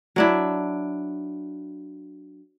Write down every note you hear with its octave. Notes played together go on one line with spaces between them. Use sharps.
F#3 D4 E4